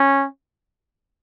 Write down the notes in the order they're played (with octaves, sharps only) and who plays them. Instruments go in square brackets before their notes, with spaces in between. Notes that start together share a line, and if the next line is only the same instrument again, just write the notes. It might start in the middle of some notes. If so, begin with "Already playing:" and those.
Already playing: [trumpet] C#4